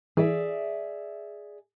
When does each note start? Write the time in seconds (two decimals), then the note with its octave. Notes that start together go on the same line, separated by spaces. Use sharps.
0.17 E3 G#4 D5 E5